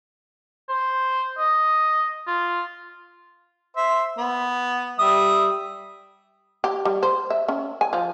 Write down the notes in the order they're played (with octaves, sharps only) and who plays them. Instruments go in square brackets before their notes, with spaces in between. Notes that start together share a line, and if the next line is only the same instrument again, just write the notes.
[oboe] C5
D#5
F4
[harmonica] C5 E5
B3
G3 E5 D#6
[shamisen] G4
G3
C5
E5
C#4
G#5
F3